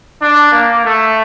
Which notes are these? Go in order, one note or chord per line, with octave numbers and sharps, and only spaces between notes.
D4
A#3
A3